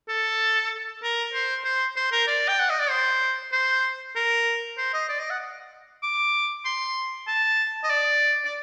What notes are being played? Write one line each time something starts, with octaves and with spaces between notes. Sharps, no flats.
A4
A#4
C5
C5
C5
A#4
D5
G5
F#5
D#5
D5
C5
C5
A#4
C5
D#5
D5
D#5
F#5
D6
C6
A5
D#5
D5
D5